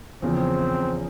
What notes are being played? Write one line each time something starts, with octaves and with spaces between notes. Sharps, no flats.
E2 C#3 F3 C4